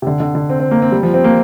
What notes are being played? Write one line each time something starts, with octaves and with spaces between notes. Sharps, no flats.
C3
D3
D3
D3
C4
C4
A#3
C4
G3
F3
C4
A#3